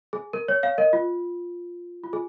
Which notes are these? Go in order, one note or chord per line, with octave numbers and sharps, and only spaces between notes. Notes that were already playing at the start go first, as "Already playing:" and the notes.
G#4
A#4
C#5
C#5 F5
A#4 D#5
F4
F4
G#4